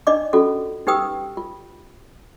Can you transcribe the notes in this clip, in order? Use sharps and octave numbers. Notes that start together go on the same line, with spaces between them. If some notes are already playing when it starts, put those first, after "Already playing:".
D4 D#4 D5 D#5 D6
C#4 F4 F#4 A4
D#4 G4 B4 G5 D#6 E6
F4